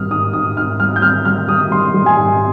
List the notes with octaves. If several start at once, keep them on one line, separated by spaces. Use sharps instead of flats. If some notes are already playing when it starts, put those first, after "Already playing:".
Already playing: G#2 G3 D#6 F6
G#2 D#6
G#2 D#6
G#2 F6
G3 F6
G6
G3 F6
G3 F6
G3 D#6
G3 C6
G3
G#5
G#2